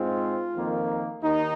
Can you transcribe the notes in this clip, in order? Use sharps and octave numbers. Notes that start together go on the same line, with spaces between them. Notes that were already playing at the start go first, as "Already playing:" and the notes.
Already playing: G#2 G#3 C4 F4
F2 D#3 A#3
D#2 D#3 D#4